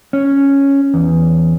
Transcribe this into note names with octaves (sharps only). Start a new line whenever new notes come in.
C#4
E2